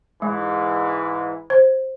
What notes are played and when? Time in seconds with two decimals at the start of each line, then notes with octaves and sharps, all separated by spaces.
0.22 G#2 E3 G#3
1.50 C5